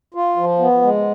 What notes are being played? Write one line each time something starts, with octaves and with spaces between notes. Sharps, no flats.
F4
F3
B3
G#3